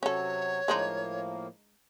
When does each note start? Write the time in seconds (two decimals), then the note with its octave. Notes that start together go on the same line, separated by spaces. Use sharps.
0.03 C3 F#3 C#4 F#4 A4 C#5
0.68 A2 F3 G#3 A#3 D4 D#4